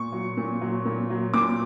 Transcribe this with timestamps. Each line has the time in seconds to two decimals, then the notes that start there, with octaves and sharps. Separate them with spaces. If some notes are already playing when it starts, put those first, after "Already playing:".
Already playing: A#2 C#6
0.12 F#3
0.37 A#2
0.61 F#3
0.85 A#2
1.10 F#3
1.34 A#2 D6